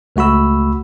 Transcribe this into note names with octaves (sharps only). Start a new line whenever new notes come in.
C#2 A3 F#4 B5 E6